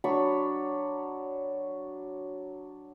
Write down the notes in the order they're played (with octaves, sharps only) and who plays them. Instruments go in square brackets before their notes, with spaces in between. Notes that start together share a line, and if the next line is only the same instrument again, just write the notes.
[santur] F#3 D4 B5 C#6